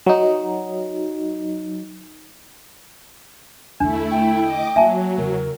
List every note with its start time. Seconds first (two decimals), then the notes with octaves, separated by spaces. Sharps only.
0.06 F#3 D#4
3.80 E2 D3 A3 D4 E4
4.11 G5
4.42 D#5 D6
4.76 F#3 A#3 E5 G#5 A5
5.18 E2 C#3 A#4